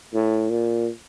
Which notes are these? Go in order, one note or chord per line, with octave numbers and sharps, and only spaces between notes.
A2
A#2